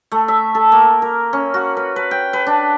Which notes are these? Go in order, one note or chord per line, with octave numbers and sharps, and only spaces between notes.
A3
E5
A4
A#3
A#4
C#4
F#4
B4
B4
G5
B4
D4